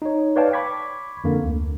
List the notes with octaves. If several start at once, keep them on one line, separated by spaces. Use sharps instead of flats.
D#4 C#5
B4 C#5 D5 F5 G5 A5
B5 C#6 D6 G#6 B6
F2 D3 A#3
D2